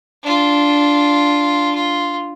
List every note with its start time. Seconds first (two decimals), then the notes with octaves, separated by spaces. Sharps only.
0.23 D4 F4
1.75 F4